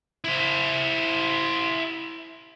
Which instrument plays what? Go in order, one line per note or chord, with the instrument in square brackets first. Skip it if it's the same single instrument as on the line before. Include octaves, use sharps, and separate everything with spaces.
[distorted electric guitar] E4 C5